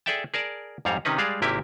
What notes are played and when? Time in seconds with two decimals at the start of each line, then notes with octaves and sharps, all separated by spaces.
0.06 G#4 A4 D5 E5 G5 A5
0.34 G#4 A#4 D5 A5
0.85 F2 G#2 G3 C#5 F5 A#5
1.05 C3 D#3 C#4 D#4 B4
1.18 G3 G#3 G#4 D5 F5
1.42 G#1 C3 A#3 E4 G4 G#5